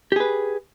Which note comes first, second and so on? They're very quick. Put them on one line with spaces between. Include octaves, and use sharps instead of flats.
G4 G#4 B4